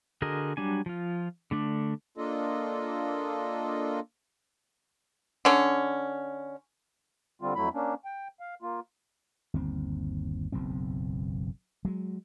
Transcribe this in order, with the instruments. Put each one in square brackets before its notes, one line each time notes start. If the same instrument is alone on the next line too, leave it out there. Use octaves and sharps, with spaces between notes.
[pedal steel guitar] D3 F#4 G#4 A#4 D#5
F#3 G3 D4 G#5
F3 F4
D3 A3 D4
[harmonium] A#3 D4 F4 A4 D#5
[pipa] D3 C#4
[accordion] D3 G3 C4 F4
F2 F#3 A3 E4 B5
A#3 C#4 D4
G5
F5
A#3 F4
[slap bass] G1 D#2 C4
F#1 B1 E2 C4
F#3 G#3